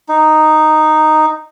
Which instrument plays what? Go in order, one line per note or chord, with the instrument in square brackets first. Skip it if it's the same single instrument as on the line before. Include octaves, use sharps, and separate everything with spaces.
[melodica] D#4